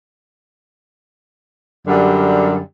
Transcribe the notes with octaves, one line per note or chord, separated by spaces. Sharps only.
F#2 D3 G3